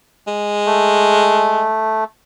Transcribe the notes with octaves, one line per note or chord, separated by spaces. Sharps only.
G#3
A3